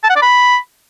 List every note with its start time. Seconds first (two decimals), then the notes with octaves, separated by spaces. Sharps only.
0.03 A5
0.10 F#5
0.16 D5
0.22 B5